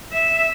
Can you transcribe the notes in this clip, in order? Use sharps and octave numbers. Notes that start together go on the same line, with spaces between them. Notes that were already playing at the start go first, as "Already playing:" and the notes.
E5